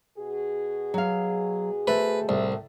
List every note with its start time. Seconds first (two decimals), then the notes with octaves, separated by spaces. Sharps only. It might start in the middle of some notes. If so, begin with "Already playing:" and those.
0.17 B2 F#4 G#4
0.94 F#3 F5
1.87 A3 B4 C5
2.29 C2 A2